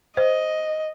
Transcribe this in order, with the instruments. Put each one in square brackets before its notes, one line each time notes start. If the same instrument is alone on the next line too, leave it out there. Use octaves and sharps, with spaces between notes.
[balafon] C5 [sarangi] D#5